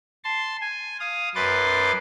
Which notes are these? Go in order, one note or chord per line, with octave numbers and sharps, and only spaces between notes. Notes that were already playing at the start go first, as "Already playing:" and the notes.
A5 C6
G#5
F5 D#6
F#2 B4 C6 D6 A6